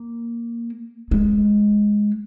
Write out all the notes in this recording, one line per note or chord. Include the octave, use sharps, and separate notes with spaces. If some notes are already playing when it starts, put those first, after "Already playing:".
Already playing: A#3
G#3